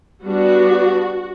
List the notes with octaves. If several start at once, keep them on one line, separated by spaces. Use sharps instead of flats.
G3 B3 D4 F#4